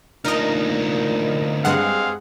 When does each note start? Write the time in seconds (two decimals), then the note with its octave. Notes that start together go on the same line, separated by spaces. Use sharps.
0.25 D2 A#2 D#4 A#4 D#5
1.65 G2 G#3 C4 G#4 F5 F#5